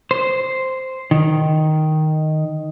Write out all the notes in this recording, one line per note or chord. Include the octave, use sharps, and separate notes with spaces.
C5
D#3